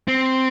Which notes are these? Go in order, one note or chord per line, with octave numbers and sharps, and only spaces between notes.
C4